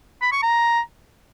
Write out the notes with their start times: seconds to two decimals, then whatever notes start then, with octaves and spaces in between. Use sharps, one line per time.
0.22 B5
0.32 C#6
0.42 A#5